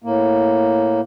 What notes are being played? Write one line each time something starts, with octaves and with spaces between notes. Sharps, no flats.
A2 A#3